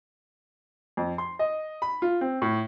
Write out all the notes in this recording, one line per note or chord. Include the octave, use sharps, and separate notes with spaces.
F2
C6
D#5
B5
F4
C4
A2